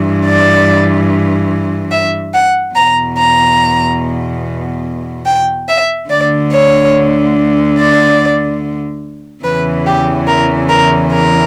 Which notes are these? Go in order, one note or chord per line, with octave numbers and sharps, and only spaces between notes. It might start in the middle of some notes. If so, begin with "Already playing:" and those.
Already playing: G2 E3
D5
E5
F#5
E2 B2 A#5
A#5
G5
E5
D2 D3 D5
C#5
D5
E2 C#3 E3 B4
G4
A#4
A#4
A#4